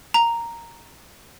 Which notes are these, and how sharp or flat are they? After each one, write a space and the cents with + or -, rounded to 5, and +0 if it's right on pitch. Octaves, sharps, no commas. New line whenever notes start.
A#5 -5